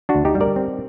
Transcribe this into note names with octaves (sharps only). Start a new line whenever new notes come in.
D4 F#4
D2
D#4 G4
G3
A#4 D5
C4